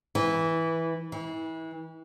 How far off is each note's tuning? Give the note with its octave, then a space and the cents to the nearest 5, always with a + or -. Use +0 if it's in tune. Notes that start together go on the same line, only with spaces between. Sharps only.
E3 -10
E3 -30